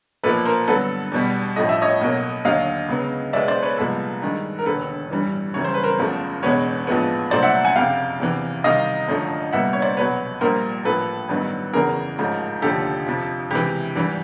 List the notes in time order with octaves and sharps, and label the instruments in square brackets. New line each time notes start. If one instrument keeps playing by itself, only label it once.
[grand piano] B1 A#2 F3 A#3 A4 B4
A#4 C5
G2 D3 F#3 B3 A4 B4
E2 B2 G3
A1 A2 F3 A3 D#5
E5
C#5 D#5
B1 B2 F#3 A#3
D#2 D3 F#3 D#5 F5
C#2 C#3 F#3 B3
B1 B2 G#3 B3 D5 E5
C5 D5
B4 C#5
C2 A#2 F3 G#3 B3 A4 B4
G2 D#3 G#3
A#4
E1 D#2 D3 A4 B4
A1 G2 E3 G3
F#2 C#3 E3 G3 C#5
C5
B4
A#4 C5
F#1 E2 C#3 F3 A3
E1 E2 B2 G#3 B3 B4 C#5
A#1 A2 F3 G#3 B3
C2 A#2 F#3 A3 C5 D5
E5 F#5
F#5 G#5
F#1 F2 C3 F5 G5
E2 C3 E3
C2 C3 D#3 D#5 F5
G#1 F#2 D3 F3 A3
C2 A#2 G3 B3 E5 F#5
C#5
C5 D5
F1 E2 B2 F#3 B4 C#5
A#1 A#2 G3 A#3 A#4 C5
A1 A2 F3 A#3 A4 B4
A1 G2 D#3 F#3 B3
F#1 E2 C#3 E3 G#4 A#4
A1 G#2 F3 A3
F1 D#2 D3 F3 G4 A4
F2 C3 F3
C#2 C3 E3 G4
G#1 G2 E3